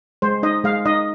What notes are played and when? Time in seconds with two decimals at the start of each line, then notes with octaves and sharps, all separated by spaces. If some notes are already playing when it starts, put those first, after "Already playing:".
0.22 G#3 C5
0.43 D#4 D#5
0.64 G#3 F5
0.86 D#4 D#5